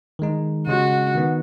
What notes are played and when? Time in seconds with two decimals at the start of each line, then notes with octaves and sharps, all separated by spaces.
0.19 D#3 G#3 D#4
0.67 C#3 G#3 C#4 F#4
1.15 D#3 B3 D#4